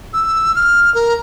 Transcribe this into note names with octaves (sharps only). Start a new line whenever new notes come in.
E6
F6
A#4